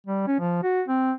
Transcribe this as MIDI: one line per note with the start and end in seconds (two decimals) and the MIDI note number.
0.07 0.23 55
0.27 0.36 61
0.40 0.59 53
0.63 0.82 66
0.88 1.12 60